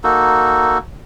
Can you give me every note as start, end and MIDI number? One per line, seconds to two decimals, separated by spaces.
0.04 0.78 58
0.04 0.78 63
0.04 0.78 66
0.04 0.78 69